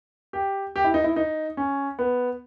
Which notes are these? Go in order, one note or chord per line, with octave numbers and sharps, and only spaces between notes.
G4
G4
E4
D#4
E4
D#4
C#4
B3